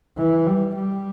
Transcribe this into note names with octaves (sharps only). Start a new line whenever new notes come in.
E3
G3
G3